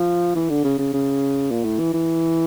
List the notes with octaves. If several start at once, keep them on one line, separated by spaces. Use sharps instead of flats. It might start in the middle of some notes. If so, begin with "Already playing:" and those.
Already playing: F3
E3
D3
C#3
C#3
C#3
A#2
A2
E3
E3